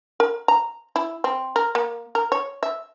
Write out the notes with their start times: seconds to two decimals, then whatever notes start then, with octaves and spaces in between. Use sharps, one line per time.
0.20 A#4
0.48 A#5
0.96 E4
1.24 C4
1.56 A#4
1.75 A#3
2.15 A#4
2.32 C#5
2.63 E5